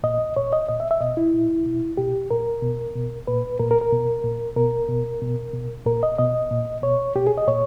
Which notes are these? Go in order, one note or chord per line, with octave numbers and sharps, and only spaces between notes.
A#2 D#5
A#2 C#5
D#5
A#2 D#5
E5
E5
B2 D#5
E4
A#2
B2
B2 G4
A#2 A#4
B2
B2
A#2 B4
A#2 A#4
A#4
A#4
B2
A#2
B2 A#4
B2
B2
B2
A#2 A#4
D#5
B2 D#5
A#2
B2 C#5
B2 G4
G#4
D#5
A#2 C#5